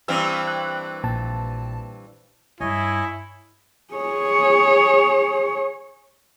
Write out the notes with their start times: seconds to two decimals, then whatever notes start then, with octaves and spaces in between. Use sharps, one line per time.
0.08 G2 E3 C4 E6 F6
0.47 F#6
1.04 A#1 A#2 A5
2.60 G2 E4 C#5 D#5 G#5
3.94 G#4 C#5